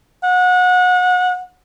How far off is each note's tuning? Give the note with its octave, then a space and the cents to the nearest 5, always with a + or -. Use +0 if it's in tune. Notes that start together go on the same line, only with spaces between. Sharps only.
F#5 -30